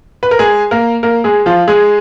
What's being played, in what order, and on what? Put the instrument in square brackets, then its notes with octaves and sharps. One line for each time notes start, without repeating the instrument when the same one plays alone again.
[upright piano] B4
A#4
G#3 G#4
A#3 A#4
A#3 A#4
G#3 G#4
F3 F4
G#3 G#4